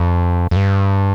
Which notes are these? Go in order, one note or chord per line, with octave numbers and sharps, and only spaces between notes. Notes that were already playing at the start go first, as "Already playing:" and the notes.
Already playing: F2
F2
G2